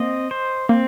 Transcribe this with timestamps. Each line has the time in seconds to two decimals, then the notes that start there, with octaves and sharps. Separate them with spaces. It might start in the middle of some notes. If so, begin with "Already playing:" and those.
Already playing: A#3 C4 D#5
0.31 C5
0.69 A#3 C4